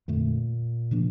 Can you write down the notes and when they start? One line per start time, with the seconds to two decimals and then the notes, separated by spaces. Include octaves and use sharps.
0.08 F2 A#2 D3 A3
0.91 C#3 F3 A#3 D4